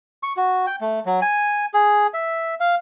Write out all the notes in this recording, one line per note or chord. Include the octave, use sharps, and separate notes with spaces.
C#6
F#4
G5
A3
F#3
G#5
G#4
E5
F5